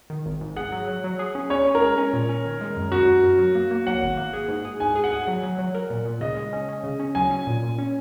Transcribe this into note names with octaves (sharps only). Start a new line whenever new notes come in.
D#3
G#1
G#2
G#4 F#5
F#3
F#3
F#3
G#4
C#4
C#4 C#5
C#4
A#4
G#3
C#4
A#2
C#4
D#3
G#3
F#2
F#2 F#4
F#2
F#2
F#3
A#3
A#3
F#3 F#5
G#1
A#3
G#4
G#2
G#4
G#2 G#5
G#4
F#5
G#4
F#3 F#5
F#3
F#3
A#4
A#2
A#2
C#3 D#5
G#3
C#4
C#4
C#3
C#4
F#3 G#5
C#4
A#2
A#2
C#4